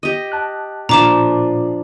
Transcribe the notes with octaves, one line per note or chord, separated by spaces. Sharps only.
G4 D#5
A5 F#6
A#2 F3 D4 A#5 D6 E7